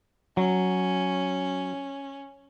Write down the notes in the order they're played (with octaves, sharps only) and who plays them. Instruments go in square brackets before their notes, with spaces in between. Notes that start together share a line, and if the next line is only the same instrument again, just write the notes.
[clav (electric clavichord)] F#3 [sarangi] C#4